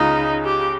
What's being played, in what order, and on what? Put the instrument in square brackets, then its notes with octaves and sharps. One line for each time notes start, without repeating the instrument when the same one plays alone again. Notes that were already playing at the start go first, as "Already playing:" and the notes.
Already playing: [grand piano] C#2 C#3 G#3 C#4 F4 [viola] D#4
[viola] G4